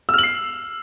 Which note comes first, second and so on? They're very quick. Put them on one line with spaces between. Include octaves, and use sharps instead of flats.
E6 F6 F#7 C7